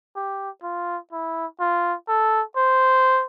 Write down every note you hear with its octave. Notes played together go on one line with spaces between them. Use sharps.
G4
F4
E4
F4
A4
C5